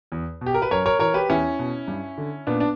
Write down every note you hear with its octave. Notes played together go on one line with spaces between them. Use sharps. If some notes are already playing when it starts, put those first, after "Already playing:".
E2
B2
G4
A#4
B4
F#2 A#4 C#5
A#4 C#5
E3 A#4 C#5
G4 B4
E2 C#4 E4
B2
G2
D3
A#2 B3 D4
D4